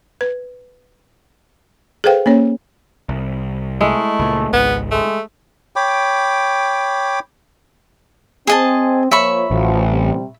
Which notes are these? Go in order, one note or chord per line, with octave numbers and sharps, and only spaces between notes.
B4
G#4 A4 B4 C5 F5 G5
A#3 C#4 C#5
C2
G#3 A3 E4
C#2 A#2
G#1 C#2 B3
G#3 A3
C#5 G5 B5 D6
C4 G#4 D#5 A5
F3 A#3 C#5 E5 B5 C#6
A1 F3 F#3
C3 G3